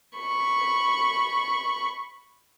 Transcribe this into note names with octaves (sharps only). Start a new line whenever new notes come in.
B5 C#6